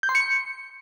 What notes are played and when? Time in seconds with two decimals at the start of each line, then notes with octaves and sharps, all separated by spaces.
0.03 G6
0.09 C6
0.15 C#7